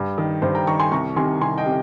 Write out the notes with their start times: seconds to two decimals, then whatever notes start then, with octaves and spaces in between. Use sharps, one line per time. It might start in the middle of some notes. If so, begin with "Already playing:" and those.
Already playing: G2
0.18 D#3
0.42 G2 C5
0.55 G5 A#5
0.67 D#3 A#5 C#6
0.80 G#5 C6
0.92 C2 A#5 C#6
1.16 C3 D#3 G#5 C6
1.41 C2 G#5 C6
1.58 D#5 G5
1.66 C3